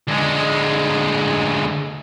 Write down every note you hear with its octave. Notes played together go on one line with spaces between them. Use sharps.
D2 G#3